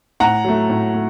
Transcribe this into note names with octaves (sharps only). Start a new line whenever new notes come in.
A2 F#5 A#5
F#3 A3
A2
A3